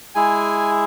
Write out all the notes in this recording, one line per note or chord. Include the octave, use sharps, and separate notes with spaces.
G#3 E4 G#4 G#5